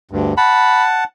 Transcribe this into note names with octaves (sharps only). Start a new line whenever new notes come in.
D2 G2
F#5 A5 B5